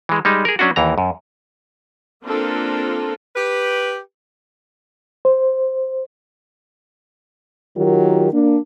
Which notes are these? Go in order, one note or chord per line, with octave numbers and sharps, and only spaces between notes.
E3 G#3
G3 G#3 D#4
G#4 A#4
F#3 C#4 D4 F#4
D#2 E3 A#5
F#2
A#3 C4 D4 F4 A4 A#4
G4 B4
C5
D#3 F#3 F4 G4 A#4
A#3 D4